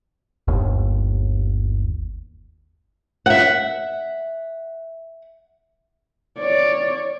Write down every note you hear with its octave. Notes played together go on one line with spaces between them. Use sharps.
G1 D#2
E5 F#5
C#5 D5